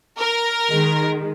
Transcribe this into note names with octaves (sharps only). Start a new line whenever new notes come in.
A#4
D#3 G#3